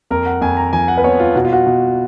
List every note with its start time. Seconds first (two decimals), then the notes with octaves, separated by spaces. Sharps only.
0.11 F2 A#4
0.26 F#5
0.41 F2 G#5
0.57 A#5
0.73 F3 G#5
0.88 F#5
0.97 B4
1.04 B3 C#5
1.20 F4
1.35 B2 F#4
1.45 F4
1.53 F#4
1.67 B2